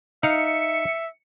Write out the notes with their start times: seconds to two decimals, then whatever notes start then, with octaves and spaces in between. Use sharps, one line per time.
0.23 D#4 E5 F5 C#7